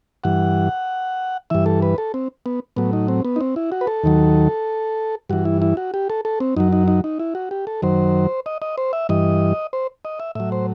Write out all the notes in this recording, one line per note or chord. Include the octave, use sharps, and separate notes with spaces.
G2 E3 F#5
G2 E3 E5
A4
B4
A4
C4
B3
A2 F#3 B3
D#4
C4
B3
D#4
C4
E4
F#4
B4
A4
D#2 D#3 F#3
G2 E3 F#4
E4
E4
F#4
G4
A4
A4
C4
F#2 F#3 D#4
D#4
D#4
D#4
E4
F#4
G4
A4
F#2 D#3 F#3 C5
D#5
D#5
C5
E5
G2 E3 D#5
C5
D#5
E5
A2 F#3 E5
C5